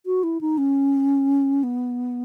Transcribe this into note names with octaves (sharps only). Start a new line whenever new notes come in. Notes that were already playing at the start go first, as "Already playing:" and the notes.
F#4
E4
D#4
C#4
B3